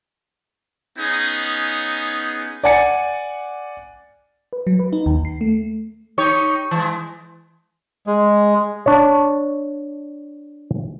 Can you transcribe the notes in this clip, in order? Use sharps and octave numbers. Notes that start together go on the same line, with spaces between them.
B3 C#4 D#4 G#4
D5 F#5 G#5 A6 C#7
B4
F#3
B4
D#4
D#2
C7
A3
D#4 G4 C#5
E3 G#3
G#3
D4 C#5